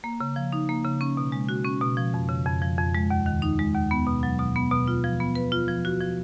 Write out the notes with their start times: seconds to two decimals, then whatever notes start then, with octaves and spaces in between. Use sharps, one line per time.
0.04 A#3
0.20 C#3
0.36 F3
0.53 D#4
0.69 A#3
0.85 C#3
1.01 C#4
1.17 B2
1.32 G#3
1.49 F#4
1.65 C#4
1.81 B2
1.97 F3
2.14 F2
2.29 C#3
2.46 F2
2.62 F3
2.78 F2
2.95 G#3
3.10 D#2
3.26 D#3
3.42 D#4
3.59 G#3
3.75 D#2
3.91 B3
4.06 B2
4.23 F#3
4.39 B2
4.56 B3
4.72 B2
4.88 F4
5.04 F3
5.20 B3
5.35 B4
5.52 F4
5.68 F3
5.85 F#4
6.01 F3